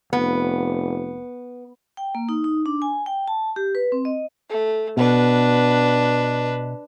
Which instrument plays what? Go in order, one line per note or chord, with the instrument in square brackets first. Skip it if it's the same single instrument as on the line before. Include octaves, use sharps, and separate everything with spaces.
[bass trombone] F1 [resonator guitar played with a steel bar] B3
[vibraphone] G5
A#3
D#4
D#4
D4
G#5
G5
A5
G4
B4
C4
D#5
[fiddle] A3
[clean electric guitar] B2 [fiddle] D4 B4